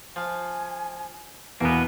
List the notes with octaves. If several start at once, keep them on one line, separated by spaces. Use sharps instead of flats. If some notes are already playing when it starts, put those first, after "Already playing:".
F3 F5 G#5
E2 B2 A#3 B3 A#4 G#5